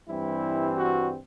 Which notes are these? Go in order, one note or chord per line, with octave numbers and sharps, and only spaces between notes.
G2 E3 G3 C4 E4
F#4